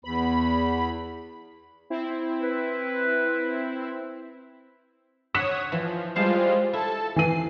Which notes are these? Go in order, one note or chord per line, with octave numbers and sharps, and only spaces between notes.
E2 B5
C4 E4
B4
C#5 F#5 D#6 F#6 B6 E7
E3 F3
G3 G#3 F4 C5 F5 A5
E4 A4 A5
E3 C7 D#7